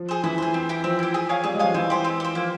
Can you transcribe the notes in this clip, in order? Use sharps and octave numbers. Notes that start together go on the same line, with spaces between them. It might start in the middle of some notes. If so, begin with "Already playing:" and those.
Already playing: F3
G#4 C5
E3 E4
G#4 C5
C4
E4 G4
F3 C4
E4 G4
G#4
C#5 F5 G#5
G3 G#4
G#3
F3 C#5 F5 G#5
E3 C4
G4 C5
C4
G4 C5
F3 A#3